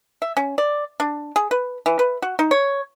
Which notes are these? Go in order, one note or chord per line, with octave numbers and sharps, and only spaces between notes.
E5
C#4
D5
D4
G#4
B4
E3
B4
F#4
D#4
C#5